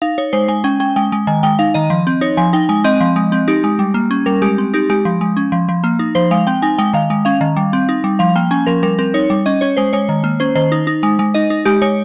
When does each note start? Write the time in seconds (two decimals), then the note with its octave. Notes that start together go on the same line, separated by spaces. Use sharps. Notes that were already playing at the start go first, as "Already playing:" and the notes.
0.02 D#4 F5
0.18 D#4 C#5
0.33 G#3 C5
0.48 G#3 G#5
0.64 C#4 G5
0.80 C#4 G5
0.96 G#3 G5
1.12 G#3
1.27 D#3 G#5
1.43 G#3 G5
1.59 D#4 F5
1.74 D#3 D#5
1.90 F3
2.07 C4
2.21 D#4 C#5
2.37 F3 G#5
2.53 D#4 G5
2.69 G#3 G#5
2.84 C4 D#5
3.01 F3
3.16 G#3
3.32 C4
3.48 D#4 G4
3.64 G#3
3.79 G3
3.94 A#3
4.11 C#4
4.26 G3 A#4
4.42 G#3 G4
4.58 C4
4.74 D#4 G4
4.90 G#3 G4
5.05 F3
5.21 G#3
5.37 C#4
5.52 F3
5.69 F3
5.84 A#3
5.99 D#4
6.15 F3 C5
6.31 G#3 F5
6.47 C4 G5
6.62 D#4 G#5
6.78 G#3 G5
6.93 D#3 F5
7.10 G#3
7.25 C#4 F5
7.41 D#3
7.57 G3
7.73 C4
7.89 D#4
8.04 G3
8.19 F3 F5
8.36 A#3 G5
8.51 C#4 G#5
8.67 F3 A#4
8.83 G3 A#4
8.99 C4 A#4
9.14 D#4 C#5
9.30 G3
9.46 C#4 D#5
9.61 C#4 C#5
9.77 G#3 C5
9.93 G#3 C#5
10.09 D#3
10.24 A#3
10.40 C#4 C5
10.55 D#3 C5
10.72 D#4
10.87 D#4
11.03 G#3
11.19 G#3
11.34 D#4 D#5
11.50 D#4
11.65 G#3 G4
11.82 G#3 C#5